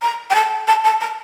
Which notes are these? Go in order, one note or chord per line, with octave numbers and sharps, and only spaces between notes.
A#5
G5
A5
A5
A5
A#5